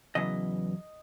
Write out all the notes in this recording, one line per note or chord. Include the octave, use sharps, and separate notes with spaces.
E2 C#3 F#3 B3 E4 D#5